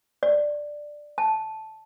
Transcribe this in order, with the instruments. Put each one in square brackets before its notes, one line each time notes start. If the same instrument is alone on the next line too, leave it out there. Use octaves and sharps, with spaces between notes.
[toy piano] D5
A5